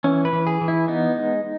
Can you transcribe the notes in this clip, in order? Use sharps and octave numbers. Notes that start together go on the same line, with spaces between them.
E3 C#4
B4
E3
G#4
E3
E4
B3 D#4
G#3